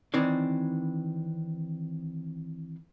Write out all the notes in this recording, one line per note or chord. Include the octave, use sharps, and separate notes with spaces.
D#3 E3 C4 D4 C#5